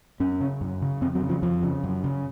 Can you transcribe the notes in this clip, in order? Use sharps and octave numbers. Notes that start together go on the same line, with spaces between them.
F#2 C#4
C#3
F#2
C#3
F2 C4
F#3
C#3
F3
F2 F3
C#3
F#2
C#3